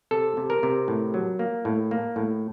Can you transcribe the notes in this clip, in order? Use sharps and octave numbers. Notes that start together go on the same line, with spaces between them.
C3 A4
C3
A#4
C3
A2
F#3
A#3
A2
A#3
A2